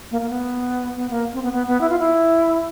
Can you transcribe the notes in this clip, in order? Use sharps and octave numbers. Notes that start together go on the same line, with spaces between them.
A#3
A#3
B3
B3
A#3
C4
B3
B3
B3
E4
F4
E4